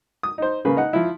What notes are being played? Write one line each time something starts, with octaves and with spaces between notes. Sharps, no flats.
D#6
D#4 C5
C#3 A#3 B4
D#4 F#5
F3 E4